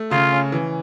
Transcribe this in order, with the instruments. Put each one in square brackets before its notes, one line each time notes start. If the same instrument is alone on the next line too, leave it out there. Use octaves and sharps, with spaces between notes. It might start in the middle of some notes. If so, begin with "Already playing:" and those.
Already playing: [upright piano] A3
[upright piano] C#3 [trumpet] F4
[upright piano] C#4
E3